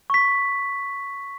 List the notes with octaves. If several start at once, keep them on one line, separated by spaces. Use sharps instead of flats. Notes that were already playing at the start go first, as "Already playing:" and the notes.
C#6 B6